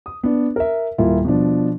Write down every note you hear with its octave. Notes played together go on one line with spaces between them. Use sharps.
D#6
B3 D4
A#4 E5
D#1 A#3 E4 F4
B2 F3 D4